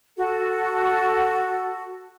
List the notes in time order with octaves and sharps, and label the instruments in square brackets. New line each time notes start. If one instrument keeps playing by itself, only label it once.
[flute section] F#4 A4